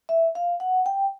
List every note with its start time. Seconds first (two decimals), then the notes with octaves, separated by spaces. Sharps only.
0.09 E5
0.35 F5
0.60 F#5
0.86 G5